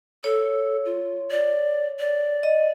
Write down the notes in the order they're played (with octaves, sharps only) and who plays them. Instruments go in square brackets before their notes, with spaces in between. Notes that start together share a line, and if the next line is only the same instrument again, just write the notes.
[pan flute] A4 [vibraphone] C#5
[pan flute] F4
D5
D5
[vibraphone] D#5